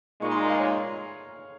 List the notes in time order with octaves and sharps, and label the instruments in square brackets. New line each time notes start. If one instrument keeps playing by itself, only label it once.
[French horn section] A#2 G#3 D#4 [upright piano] C#6
[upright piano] C6
A#5
F5
C#5